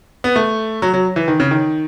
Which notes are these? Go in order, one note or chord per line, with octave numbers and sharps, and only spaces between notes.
B3
A3
F#3
F#3
E3
D#3
C#3
D#3